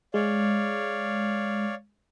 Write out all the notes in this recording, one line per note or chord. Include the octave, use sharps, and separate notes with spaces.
G#3 C#5 D5 F5